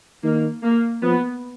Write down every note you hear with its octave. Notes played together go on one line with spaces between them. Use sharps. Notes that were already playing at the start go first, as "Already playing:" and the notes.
D#3 A#3
A#3
F3 B3